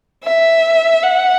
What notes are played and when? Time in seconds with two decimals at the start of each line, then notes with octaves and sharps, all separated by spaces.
0.25 E5
1.03 F#5